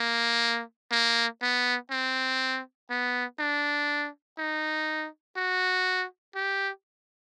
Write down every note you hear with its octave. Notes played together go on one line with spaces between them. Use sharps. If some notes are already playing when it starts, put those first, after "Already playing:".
Already playing: A#3
A#3
B3
C4
B3
D4
D#4
F#4
G4